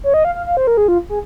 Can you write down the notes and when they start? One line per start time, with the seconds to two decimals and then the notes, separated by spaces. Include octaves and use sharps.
0.04 C#5
0.14 D#5
0.25 F5
0.35 F5
0.46 F5
0.57 C5
0.67 A#4
0.77 G#4
0.88 F4
1.09 G#4